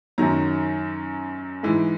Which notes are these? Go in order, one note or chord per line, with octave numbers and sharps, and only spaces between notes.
F#2 D#3 F#3 A#5
G#2 E3 G#3